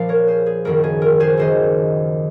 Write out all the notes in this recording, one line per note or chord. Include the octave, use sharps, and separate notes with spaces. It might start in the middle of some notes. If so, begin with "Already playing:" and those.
Already playing: A#1 A#2 F3 F5
A#4 C#5
G#4 C5
G#4
F#1 F#2 D#3 A#4
G#4
A#4
G#4 C5
D#2 D#3 C5 D#5